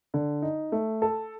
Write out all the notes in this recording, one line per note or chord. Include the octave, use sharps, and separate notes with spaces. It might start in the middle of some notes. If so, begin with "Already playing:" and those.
D3
D#4
A3
A4